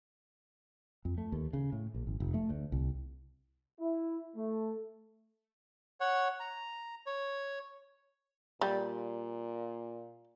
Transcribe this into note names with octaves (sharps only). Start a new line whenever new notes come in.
F2
A3
D#2
C#3
A2
A#1
G#1
F1
A3
D2
C2
E4
A3
C#5 F#5
A#5
C#5
A#2 G3